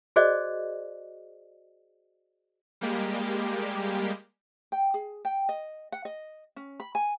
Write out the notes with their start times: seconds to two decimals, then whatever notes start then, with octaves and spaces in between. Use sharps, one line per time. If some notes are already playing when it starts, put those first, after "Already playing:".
0.16 F#4 G#4 C5 D5 D#5
2.81 G3 G#3 A#3 G4
4.72 G5
4.94 G#4
5.25 G5
5.49 D#5
5.92 F#5
6.05 D#5
6.56 C#4
6.80 B5
6.95 G#5